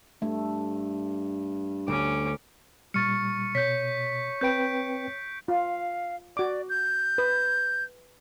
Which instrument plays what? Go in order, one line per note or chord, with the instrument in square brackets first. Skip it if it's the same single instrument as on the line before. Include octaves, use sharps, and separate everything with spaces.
[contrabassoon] G2 [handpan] A3
[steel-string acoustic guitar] D2 [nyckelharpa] C#4 D6
[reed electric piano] A#2 G3 [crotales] C#6 C#7 [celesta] F6 A6
[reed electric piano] B2 [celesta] C#5 [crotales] G6 B6
[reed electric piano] C4 B4 G5 [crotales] G6 D7
[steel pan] F4 [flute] F5
[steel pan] F#4 D6 [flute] D5
[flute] G6
[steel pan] B4